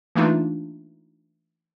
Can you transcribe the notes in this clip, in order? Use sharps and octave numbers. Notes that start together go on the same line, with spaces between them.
E3 A3 A#3 D4 D#4 F4